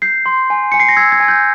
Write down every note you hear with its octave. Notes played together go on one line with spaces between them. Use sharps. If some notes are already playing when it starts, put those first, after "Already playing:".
G6 C7
C6
G#5
G#5 C#7
C7
A#6
E6 G#6
G#6
G#5
G6